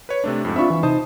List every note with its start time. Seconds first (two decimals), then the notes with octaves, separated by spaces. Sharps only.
0.09 B4 C#5
0.24 C3 A3 D4
0.45 F2 G#2
0.56 C4 D4 F4 E5 B5 C#6
0.70 E3
0.83 C3 D#4 C5 A5 D#6